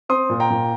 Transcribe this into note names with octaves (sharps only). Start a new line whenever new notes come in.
C4 C6 D#6
A#2
G5 A#5
A#2